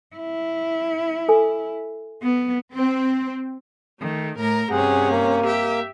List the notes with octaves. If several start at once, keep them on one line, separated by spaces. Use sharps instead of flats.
E4
A4 G#5
B3
C4
D#3 A3
A2 A#4 A#5
G2 C3 C#4 G#4 F#5
A#3
G4 E5